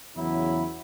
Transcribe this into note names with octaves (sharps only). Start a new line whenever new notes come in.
E2 C#3 F#3 E4